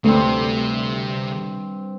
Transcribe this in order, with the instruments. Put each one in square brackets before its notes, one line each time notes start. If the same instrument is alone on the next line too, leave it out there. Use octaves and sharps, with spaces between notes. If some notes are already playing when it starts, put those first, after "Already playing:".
[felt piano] D2 [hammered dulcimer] G2 C4 [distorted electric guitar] C3